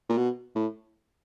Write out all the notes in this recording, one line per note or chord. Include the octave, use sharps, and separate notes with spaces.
A#2
B2
A2